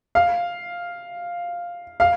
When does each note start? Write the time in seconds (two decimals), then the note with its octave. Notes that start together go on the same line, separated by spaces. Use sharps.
0.15 F5
2.00 F5